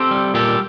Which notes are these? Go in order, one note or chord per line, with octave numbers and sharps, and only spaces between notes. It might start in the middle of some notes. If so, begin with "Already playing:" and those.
Already playing: C4 G4 A4
G3
A#2 G4 A4